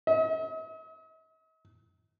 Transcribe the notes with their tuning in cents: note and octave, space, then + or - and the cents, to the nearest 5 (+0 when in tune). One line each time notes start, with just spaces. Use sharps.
D#5 +45